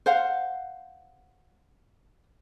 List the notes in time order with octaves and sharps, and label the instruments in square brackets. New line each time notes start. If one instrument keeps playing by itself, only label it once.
[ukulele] C5 F5 F#5